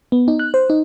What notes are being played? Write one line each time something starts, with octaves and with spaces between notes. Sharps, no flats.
B3
D#4
F#6
C5
D#4